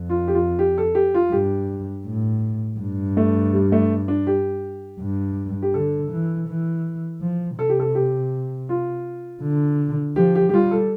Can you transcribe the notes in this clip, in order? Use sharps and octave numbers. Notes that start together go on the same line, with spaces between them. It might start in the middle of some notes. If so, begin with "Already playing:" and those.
Already playing: F2
F4
G4
F4
G4
A4
G4
F4
G2 G4
A2
G2
A3
G3
A3
D4
G4
G2
G4
D3 A4
E3
E3
F3
C3 A4
G4
A4
G4
F4
D3
F3 G4
G4
G4
G3 F4
A4